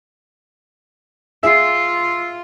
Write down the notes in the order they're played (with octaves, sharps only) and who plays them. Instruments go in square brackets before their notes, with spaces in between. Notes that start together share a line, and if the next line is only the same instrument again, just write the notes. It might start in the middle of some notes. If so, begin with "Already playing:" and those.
[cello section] F4 [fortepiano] G#4 E5 [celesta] E6 C7